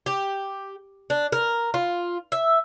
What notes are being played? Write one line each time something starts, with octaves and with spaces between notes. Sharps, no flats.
G4
D4
A#4
F4
E5